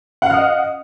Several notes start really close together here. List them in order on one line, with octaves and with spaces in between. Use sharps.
F#5 F5 F6 D#6 D#5